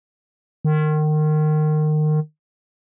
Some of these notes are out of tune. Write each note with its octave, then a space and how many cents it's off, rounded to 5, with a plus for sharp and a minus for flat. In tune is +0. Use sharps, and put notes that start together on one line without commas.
D#3 -25